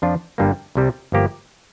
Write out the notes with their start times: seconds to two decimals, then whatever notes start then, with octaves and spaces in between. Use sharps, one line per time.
0.02 F2 F3 D4 F4
0.38 G1 G2 G3 A#3
0.75 C2 C3 G3
1.12 G1 F3 A#3 G4